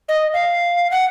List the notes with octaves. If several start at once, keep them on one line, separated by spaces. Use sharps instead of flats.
D#5
F5
F#5